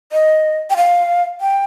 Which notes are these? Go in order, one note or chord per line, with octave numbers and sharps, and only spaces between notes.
D#5
G5
F5
G5